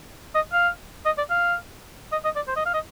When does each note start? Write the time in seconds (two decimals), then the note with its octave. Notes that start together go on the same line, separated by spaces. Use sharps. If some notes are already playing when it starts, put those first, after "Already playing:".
0.35 D#5
0.53 F5
1.06 D#5
1.18 D5
1.30 F5
2.12 D#5
2.25 D#5
2.36 D5
2.48 C5
2.56 D#5
2.66 F5
2.74 D#5